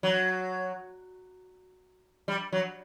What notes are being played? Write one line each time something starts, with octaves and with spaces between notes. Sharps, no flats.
F#3
G3
F#3